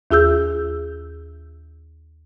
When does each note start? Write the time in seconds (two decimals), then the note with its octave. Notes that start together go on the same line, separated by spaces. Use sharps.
0.11 D#2 F4 G#4 E6 G6